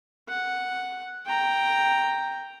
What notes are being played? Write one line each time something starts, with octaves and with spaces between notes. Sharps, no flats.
F#5
G5 A#5